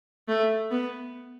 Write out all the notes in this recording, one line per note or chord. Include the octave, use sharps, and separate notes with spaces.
A3
B3